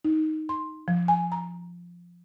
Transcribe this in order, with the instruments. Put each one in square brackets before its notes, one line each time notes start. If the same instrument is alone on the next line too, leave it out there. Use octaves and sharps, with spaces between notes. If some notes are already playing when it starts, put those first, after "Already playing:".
[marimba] D#4
C6
F3
G#5
A#5